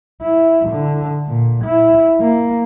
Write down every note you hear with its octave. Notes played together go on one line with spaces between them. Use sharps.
E4
D3
A#2
E4
A#3